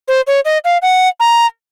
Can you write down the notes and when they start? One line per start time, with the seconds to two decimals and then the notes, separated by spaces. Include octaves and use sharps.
0.08 C5
0.27 C#5
0.45 D#5
0.65 F5
0.82 F#5
1.20 A#5